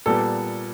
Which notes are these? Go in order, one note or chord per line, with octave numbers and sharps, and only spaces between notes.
A#2 G3 B3 A4